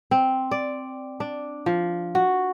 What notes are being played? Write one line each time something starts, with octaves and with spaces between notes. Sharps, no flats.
C4
D5
D4
F3
F#4